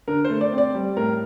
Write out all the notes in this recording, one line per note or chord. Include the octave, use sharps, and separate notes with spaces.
D3 A#4
C5
A3
D5
C4
D5
G3
A2 A#4